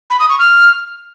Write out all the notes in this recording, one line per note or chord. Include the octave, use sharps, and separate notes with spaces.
B5
D#6
C#6
F6